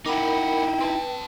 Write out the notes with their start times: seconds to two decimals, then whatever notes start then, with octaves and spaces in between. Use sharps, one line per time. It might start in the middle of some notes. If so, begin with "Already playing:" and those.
0.06 A#3 D#4 E4 A#4 F#5 G5 B5
0.81 C4 B4 A5